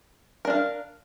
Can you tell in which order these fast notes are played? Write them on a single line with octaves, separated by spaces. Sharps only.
A#4 D4 F5